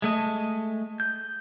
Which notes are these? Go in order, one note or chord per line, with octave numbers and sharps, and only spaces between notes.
G#3 A3 D#5
G6